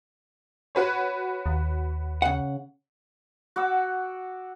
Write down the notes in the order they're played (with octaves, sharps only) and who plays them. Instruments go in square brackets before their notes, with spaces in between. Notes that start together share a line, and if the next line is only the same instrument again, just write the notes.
[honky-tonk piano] F#4 B4 C#5
[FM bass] D#2
[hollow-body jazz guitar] C#3 F#5
[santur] F#4 F#5 D6 E6